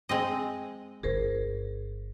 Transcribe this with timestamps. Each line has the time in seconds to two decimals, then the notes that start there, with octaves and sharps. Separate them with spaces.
0.09 G#3 C4 D#5
1.03 G1 F4 G#4 A#4 C5